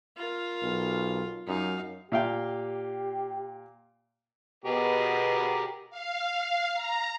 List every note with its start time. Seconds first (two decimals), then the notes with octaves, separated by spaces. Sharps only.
0.17 F4 A#4
0.62 B1
1.48 F#2 D#4 F5
2.12 A#2 G4 F5 G5
4.64 B2 G4 G#4 A#4
5.90 F5
6.74 A#5